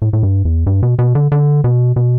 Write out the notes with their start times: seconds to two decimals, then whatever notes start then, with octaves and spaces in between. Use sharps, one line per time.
0.02 A2
0.13 A2
0.23 G2
0.45 E2
0.67 G2
0.83 B2
0.99 B2
1.15 D3
1.32 D3
1.64 B2
1.96 B2